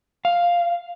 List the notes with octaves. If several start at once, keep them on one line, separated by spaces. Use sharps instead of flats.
F5